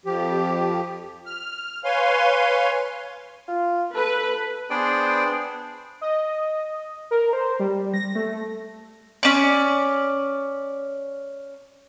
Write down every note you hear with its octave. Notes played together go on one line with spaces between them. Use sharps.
F2 F3 G4
F6
B4 C#5 F5 G#5 C6
F4
A4 B4
B3 D4 G#4 C5 D5 G5
D#5
A#4
C5
G3
A#6
A3
C#4 D5